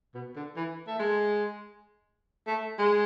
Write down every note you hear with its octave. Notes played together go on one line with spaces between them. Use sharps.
B2
D3
E3
A3
G#3
A3
G#3